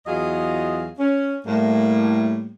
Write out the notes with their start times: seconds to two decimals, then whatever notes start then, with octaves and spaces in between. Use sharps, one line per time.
0.06 E2 F#3 F4 G#4 D#5 F5
0.98 C#4
1.46 A2 G3 A#3